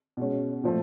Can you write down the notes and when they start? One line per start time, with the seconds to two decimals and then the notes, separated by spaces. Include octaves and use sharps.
0.17 B2 G#3 C#4
0.63 A#2 F3 A3